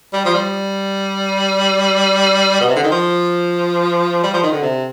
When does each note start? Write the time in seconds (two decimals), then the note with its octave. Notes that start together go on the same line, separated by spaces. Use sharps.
0.13 G3
0.25 F3
0.34 G3
2.61 B2
2.68 C3
2.76 D3
2.83 D#3
2.91 F3
4.23 G3
4.33 F3
4.43 D#3
4.52 D3
4.62 C3